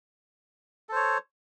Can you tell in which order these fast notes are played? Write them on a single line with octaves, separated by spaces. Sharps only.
A4 C5 C#5